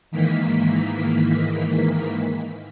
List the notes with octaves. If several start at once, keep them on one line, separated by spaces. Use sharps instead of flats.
G#2 D#3 E3 A#3 B6